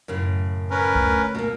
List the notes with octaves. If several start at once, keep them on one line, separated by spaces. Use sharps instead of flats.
F#2 A2 C#3
C#4 A#4 B4
D2
B2 A#3